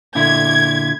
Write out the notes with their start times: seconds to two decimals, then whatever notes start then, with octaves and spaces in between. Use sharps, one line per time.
0.15 A#2 D3 E4 G#6